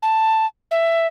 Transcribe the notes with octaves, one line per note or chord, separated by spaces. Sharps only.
A5
E5